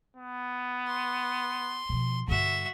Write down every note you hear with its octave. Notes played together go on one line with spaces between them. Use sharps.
B3
C6
B2 F3
G2 D3 F#4 E5